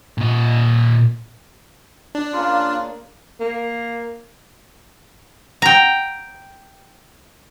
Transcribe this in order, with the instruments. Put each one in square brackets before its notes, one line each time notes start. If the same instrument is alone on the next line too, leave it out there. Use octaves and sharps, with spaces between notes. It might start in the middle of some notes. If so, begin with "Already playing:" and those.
[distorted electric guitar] A#2 D#5
[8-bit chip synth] D4
[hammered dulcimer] C#3 A#3 [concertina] F4
[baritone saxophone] A#3
[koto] G5 A#5